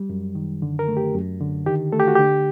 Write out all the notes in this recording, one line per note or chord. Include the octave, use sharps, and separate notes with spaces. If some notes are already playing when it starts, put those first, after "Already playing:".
Already playing: G3
F#2
D#3
D3
A#4
A3
G4
F#2
D3
D#3 G4
A3 A4
G4
F#4
D3 G4